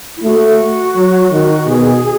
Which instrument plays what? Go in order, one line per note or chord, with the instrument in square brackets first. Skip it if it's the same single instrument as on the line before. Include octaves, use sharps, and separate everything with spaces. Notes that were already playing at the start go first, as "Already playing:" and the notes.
[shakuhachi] E4
[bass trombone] A3 [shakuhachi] F#4
[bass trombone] F#3
D#3
[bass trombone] B2 [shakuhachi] G#4